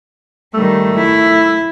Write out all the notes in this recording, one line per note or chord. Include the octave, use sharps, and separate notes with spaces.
D#3 G3 A3
E4